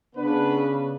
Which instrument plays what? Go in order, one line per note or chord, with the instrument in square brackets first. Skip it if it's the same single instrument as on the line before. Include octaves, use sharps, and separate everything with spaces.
[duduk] C#3 [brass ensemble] B3 D4 B4